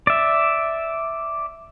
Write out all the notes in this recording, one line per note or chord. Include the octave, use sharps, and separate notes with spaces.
D5 E5